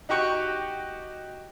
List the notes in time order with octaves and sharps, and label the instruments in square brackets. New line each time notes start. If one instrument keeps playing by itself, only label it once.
[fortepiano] D#4 F#4 G4 C#6